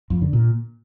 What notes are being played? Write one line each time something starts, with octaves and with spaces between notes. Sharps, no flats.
F2
D3
A#2